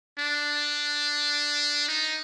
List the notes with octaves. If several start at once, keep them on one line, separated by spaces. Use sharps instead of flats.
D4
D#4